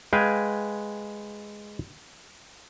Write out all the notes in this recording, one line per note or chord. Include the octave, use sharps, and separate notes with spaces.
G#3 B4 F5 G5 G#5